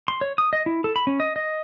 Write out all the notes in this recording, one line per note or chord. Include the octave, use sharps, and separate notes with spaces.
C6
C#5
D#6
D#5
E4
A4
B5
C#4
D#5
D#5